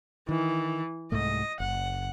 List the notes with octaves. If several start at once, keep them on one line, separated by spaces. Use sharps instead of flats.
D#3 E3
C2 G#2 A3 D#5
F#1 F#5